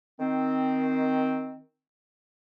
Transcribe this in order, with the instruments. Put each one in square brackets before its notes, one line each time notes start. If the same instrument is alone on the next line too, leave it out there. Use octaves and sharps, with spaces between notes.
[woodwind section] D#3 C4